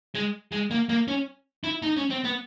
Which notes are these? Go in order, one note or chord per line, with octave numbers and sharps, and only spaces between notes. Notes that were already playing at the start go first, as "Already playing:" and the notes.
G#3
G#3
A#3
A#3
C#4
E4
D#4
C#4
C4
B3